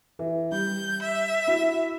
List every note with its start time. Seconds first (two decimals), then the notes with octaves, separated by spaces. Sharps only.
0.19 E3
0.52 G3 G6
1.02 E5
1.47 E4 F#4